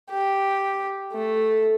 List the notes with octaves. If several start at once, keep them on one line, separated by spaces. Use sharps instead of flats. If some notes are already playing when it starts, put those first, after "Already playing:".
G4
A3